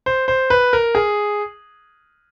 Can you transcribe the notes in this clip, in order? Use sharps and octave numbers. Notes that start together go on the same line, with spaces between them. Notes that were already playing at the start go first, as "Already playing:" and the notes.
C5
C5
B4
A#4
G#4